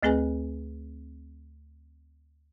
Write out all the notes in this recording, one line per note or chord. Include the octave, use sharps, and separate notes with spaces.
D2 A3 C4 G#4 B4 G#5